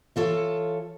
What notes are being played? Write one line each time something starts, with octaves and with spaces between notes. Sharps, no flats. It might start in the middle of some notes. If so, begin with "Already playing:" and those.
E3 F4 A4 C#5